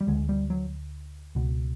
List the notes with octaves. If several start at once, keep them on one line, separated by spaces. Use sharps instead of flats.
G3
D2 D3 G#3
G3
F#3
C#2 B2